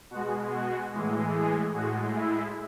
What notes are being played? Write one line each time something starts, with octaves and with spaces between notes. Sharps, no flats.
B2 G#3 F#4
F#4
A2 E3 G#3
G#4
A2 G#3 F#4
E4